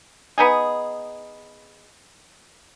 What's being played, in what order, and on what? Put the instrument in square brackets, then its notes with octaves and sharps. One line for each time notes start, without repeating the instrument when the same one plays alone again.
[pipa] B3 D#4 G#4